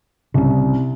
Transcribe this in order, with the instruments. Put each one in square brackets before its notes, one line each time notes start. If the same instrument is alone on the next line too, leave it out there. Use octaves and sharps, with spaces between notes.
[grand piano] C2 [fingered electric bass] C#3 C#4